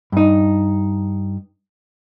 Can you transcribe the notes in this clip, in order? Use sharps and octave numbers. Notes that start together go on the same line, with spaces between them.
G2 D#4